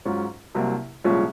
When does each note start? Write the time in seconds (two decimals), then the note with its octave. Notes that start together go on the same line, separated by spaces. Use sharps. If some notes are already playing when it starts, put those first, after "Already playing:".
0.05 G#2 F#3 C#4 F4
0.55 C2 C3 F#3 A#3
1.04 C2 A#2 F3 G#3 C#4